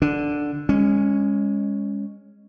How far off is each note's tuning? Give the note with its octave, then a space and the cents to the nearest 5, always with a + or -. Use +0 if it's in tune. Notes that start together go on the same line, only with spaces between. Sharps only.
D3 +0 D4 +0
G#3 -20 C#4 +0